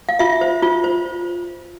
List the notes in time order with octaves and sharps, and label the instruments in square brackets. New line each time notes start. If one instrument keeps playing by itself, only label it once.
[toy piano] F5
F4 E5
C5
F4
C5